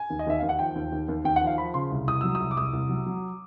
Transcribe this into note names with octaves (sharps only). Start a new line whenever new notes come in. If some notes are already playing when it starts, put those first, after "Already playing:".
Already playing: G#5
D#2
D#5
D#2 E5
D#2 F5
F#5
F3 G5
D#2
D#2
D#2
D#2 G5
F#5
F3
F5
F3 B5
C#3 C6
C2
C2 D#6
F#3 E6
C2 D#6
D6
C2 D#6
C2
F#3
F#3